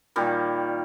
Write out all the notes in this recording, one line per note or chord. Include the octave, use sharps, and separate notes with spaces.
A#2 D#3 G3